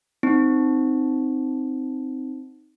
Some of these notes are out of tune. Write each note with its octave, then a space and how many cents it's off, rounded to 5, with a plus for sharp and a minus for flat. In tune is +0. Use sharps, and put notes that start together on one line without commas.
C4 +0 D#4 -5